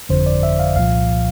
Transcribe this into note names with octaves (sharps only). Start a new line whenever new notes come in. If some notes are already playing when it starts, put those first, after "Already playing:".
G1 F2 D3 F3 C5
D5
E5
F5
C2 A#2 F3 F5